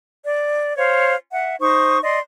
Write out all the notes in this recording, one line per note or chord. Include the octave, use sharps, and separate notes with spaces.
D5
C5 C#5 F5
E5 F#5
D#4 C5 C#6 D#6
D5 D#5 C6